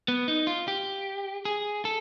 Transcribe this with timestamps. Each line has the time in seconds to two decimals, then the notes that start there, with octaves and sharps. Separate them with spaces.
0.08 B3
0.28 D#4
0.47 F4
0.68 G4
1.45 G#4
1.85 A4